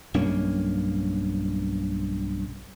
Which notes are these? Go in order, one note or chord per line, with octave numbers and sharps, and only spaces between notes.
B1 G2 A#3 C#4